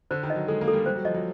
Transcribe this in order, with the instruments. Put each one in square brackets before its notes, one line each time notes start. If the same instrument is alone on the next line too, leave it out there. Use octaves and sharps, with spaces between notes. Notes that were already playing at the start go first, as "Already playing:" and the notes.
[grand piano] D3 [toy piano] C5
[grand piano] D#3
[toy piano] D#5
[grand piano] F#3
[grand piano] G#3 [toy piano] A4
[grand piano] A#3
[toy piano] A4
[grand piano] G3
[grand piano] G3 [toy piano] C5
[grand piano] F#3
[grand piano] F3 [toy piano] D#5
[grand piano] F#3